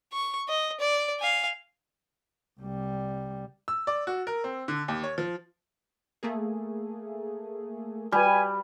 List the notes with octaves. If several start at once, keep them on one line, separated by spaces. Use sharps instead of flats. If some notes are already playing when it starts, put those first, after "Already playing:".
C#6
D#5
D5
F5 G#5
C2 G3
E6
D5
F#4
A#4
C4
D3
D#2
C#5
F3
A3 A#3 G#4
G3 G#5